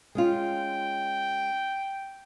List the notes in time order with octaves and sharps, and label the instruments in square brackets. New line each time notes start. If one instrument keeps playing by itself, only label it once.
[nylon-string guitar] G#3 C#4 F4 [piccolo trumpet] G5